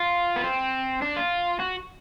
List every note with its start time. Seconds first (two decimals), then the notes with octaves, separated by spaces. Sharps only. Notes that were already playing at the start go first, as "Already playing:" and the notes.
Already playing: F4
0.36 B3
0.44 C4
1.02 D4
1.16 F4
1.60 F#4